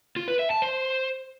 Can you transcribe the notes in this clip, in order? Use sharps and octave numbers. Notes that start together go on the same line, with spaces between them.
F4
B4
E5
A5
C5